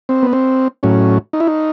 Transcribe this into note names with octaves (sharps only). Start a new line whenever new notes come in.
C4
B3
C4
A2 F#3 C#4
D#4
E4
D#4